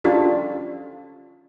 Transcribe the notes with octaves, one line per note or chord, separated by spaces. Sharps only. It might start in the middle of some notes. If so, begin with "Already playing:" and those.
C#4 D4 F4 G4 A4